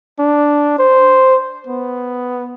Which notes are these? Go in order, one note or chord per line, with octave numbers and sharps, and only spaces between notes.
D4
C5
B3